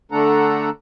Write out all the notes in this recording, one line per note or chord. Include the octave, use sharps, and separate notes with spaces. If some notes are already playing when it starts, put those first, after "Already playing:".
D3 A3 D4 A4 F#5 A#5